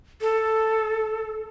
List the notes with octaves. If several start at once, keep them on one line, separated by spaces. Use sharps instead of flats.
A4